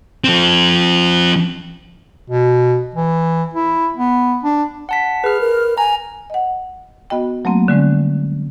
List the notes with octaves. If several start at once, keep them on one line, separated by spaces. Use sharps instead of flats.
F3 C4
B2
E3
E4
B3
D4
F#5 A5 B6
G#4 B4 F6
A#4
G#5 A#5
D#5 F#5
B3 F#4 D#5 G5
F#3 A3 A#3 C4
D3 G3 G#3 C#4